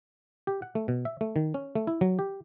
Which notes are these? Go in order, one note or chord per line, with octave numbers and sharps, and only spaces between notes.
G4
F#5
A3
B2
E5
A3
D#3
C#4
A3
E4
F#3
G4